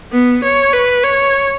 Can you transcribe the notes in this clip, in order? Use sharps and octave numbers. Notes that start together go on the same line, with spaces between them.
B3
C#5
B4
C#5